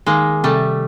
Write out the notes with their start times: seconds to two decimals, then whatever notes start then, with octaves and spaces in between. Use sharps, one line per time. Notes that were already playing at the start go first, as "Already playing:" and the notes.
0.06 D#3 G#3 A#3
0.44 C3 G3 A3